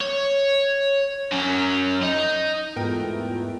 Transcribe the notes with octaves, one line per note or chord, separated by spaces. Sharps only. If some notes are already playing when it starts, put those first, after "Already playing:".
C#5
F#2 C#4
D#4
E2 G#2 A3 B3 F4 A#4 G5